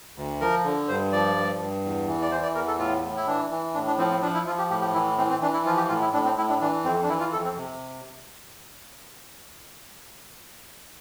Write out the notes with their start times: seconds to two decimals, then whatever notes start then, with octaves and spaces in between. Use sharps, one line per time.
0.16 D2
0.41 F3 A#4
0.64 D3
0.88 G2 C5
1.12 F3 D5
1.36 G2
1.59 G2
1.84 E2
2.08 E3
2.22 D5
2.32 E3 C5
2.43 D5
2.55 E2 A#4
2.68 A4
2.79 A2 F4
3.03 A2
3.17 E4
3.27 E3 D4
3.50 E3
3.74 A2 D4
3.87 D4
3.98 F3 C4
4.11 C4
4.22 F3 D4
4.34 E4
4.47 F3 F4
4.59 G4
4.70 A2 G4
4.81 G4
4.94 E3 E4
5.18 E3 C4
5.29 C4
5.41 E3 D4
5.53 E4
5.66 F3 F4
5.77 G4
5.89 A2 F4
6.01 E4
6.13 A2 D4
6.25 C4
6.37 A2 E4
6.49 D4
6.60 E3 D4
6.84 F2 C4
7.03 D4
7.08 E3 E4
7.20 F4
7.33 F2 A4
7.45 C4
7.57 C3